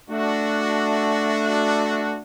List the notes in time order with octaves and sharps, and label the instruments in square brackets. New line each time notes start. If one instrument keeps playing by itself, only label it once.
[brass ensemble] A3 D4 F#4